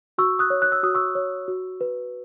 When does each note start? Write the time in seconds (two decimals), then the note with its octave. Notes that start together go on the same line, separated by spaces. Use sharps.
0.18 F#4 C#6 E6
0.39 D#6 F#6
0.50 C#5
0.62 F#6
0.72 E6
0.83 F#4 D#6
0.95 C#6 E6
1.15 C#5
1.48 F#4
1.81 B4